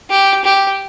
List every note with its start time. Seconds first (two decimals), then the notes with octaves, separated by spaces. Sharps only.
0.10 G4
0.44 G4